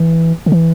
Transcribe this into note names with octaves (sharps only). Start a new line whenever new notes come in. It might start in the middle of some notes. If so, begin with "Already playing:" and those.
Already playing: E3
D3
E3